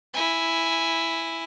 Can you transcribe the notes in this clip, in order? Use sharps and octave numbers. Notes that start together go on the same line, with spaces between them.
E4 G#5